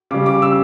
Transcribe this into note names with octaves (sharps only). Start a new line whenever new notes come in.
C#3 G3 D6
D6
E6